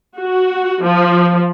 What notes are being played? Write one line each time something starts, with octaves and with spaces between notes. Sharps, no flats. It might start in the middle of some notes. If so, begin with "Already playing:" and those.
F#4
F3